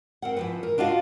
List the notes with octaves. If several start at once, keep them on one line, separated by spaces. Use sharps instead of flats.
C4 A#4 F#5
E3 F3 B4
A#4
D4 F4 F#4 D#5 F5